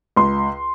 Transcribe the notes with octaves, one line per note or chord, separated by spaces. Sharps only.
C#2 C6